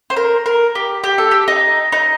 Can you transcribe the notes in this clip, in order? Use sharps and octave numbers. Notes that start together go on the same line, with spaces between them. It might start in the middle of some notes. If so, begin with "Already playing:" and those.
C5
A#4
A#4
G4
G4
A4
G4
D#4
D#4